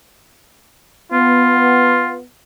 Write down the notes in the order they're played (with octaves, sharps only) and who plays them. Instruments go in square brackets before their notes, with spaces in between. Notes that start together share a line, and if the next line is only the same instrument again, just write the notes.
[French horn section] B3 [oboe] F4